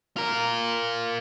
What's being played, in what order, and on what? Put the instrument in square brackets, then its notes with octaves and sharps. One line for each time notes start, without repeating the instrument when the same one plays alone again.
[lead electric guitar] F4 A#4